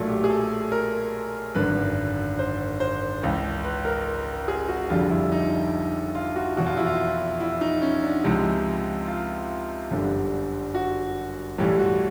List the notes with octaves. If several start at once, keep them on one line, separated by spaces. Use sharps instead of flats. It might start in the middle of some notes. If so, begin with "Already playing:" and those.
Already playing: B1 A#2 F#3 A3
G4
G#4
A4
A#4
G#1 F#2 D3 B4
C5
C5
C#2 C#3 E3
B4
A#4
G#4
F#4
F1 F2 D3 G3 F4
E4
D#4
F4
F#4
F1 E2 B2 F#4
F4
E4
F4
E4
D#4
C#4
D4
C#2 C3 F3 G#3 E4
F4
G1 F#2 D3 G3
F#4
B1 A2 E3 G3 G4
F#4